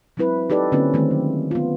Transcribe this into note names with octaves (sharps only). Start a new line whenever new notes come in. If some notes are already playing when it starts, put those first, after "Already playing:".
F#3 G#3 C4 E4 B4
D#4 G4 A4 B4 D5
D3 A#3 C4 C#4 F4 B4
D#3 G#3 A3 C4
F#3
B3 F4